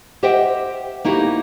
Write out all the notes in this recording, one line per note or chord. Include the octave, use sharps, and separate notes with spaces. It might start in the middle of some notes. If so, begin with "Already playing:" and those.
G4 C5 D#5 E5 F#5 G5
A#3 D#4 E4 F#4 G4